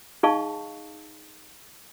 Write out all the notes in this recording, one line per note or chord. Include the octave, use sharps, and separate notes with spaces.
D#4 G#4 D#5 F5 A5 C#6